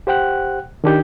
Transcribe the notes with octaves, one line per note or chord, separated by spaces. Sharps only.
G4 C5 F#5 G5 F#6
D#3 D4 G4 G6